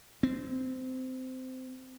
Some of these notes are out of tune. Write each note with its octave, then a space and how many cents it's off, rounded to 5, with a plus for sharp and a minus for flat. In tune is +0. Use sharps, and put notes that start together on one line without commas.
C4 -20